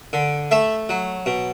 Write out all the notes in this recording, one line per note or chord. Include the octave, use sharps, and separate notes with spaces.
D3
A3 E5
F#3
B2